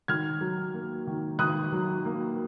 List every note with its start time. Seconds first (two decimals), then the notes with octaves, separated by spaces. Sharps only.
0.08 D#3 F6 G#6
0.41 F#3
0.74 A#3
1.07 D#3
1.39 D#3 D#6 F#6
1.72 F#3
2.05 A#3